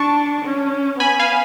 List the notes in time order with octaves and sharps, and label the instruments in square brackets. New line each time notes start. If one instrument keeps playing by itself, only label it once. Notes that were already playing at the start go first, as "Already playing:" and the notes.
Already playing: [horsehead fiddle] D4 [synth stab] A5 C#6
[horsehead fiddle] C#4
[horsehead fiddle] B3 [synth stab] G#5 B5
[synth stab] F5 G#5